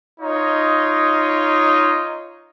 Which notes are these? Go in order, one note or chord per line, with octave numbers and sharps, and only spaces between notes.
D#4 F4 C#5 D#5